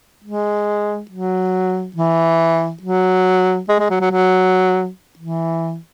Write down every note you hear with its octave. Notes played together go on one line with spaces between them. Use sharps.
G#3
F#3
E3
F#3
G#3
G#3
F#3
F#3
F#3
E3